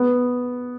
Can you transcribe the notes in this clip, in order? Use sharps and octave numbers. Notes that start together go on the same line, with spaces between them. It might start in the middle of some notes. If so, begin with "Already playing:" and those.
Already playing: B3